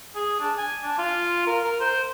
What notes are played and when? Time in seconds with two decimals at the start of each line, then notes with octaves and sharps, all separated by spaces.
0.15 G#4
0.40 D4
0.58 G#5
0.83 D4
0.98 F4
1.47 A#4
1.63 A#4
1.80 C5